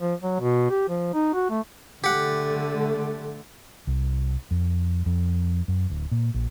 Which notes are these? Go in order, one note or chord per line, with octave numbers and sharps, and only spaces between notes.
F3
F#3
B2
G4
F3
D#4
F#4
A3
D3 A3 G4 F#5
C2
F2
F2
F#2
D1
A#2
A#1